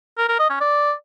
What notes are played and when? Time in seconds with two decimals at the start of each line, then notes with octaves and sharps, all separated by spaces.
0.18 A#4
0.28 A#4
0.39 D#5
0.50 C#4
0.60 D5